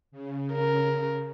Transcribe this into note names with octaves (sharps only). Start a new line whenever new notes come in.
C#3
A#4